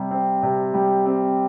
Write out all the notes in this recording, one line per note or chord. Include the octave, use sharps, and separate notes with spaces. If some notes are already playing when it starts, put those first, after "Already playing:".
Already playing: C3 G3
C4
C3
G3
C4